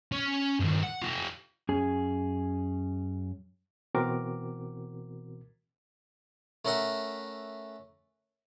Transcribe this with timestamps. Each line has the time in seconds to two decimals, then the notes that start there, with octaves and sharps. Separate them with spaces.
0.12 C#4
0.60 G2 D#3
0.83 F#5
1.02 F4 G4
1.69 F#2 C#4 G#4
3.95 B2 E3 C4 F#4 A#4 D6
6.65 A3 C#4 A#4 E5 F#5